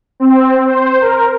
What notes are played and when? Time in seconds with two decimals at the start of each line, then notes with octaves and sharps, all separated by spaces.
0.20 C4
0.66 C5
1.01 A#4